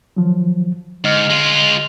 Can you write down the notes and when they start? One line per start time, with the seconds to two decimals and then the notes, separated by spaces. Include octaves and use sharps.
0.17 D#3 F3 F#3
1.04 G#2 D3 D#5 F6
1.30 G#3 F4